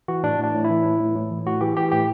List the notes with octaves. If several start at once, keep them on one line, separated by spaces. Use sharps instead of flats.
E3 F#4
A2 D4
A2 D4
A2
E4
E3
A2
A2
A2
E3
A2 F#4
E3 G4
E3 G4
A2 G4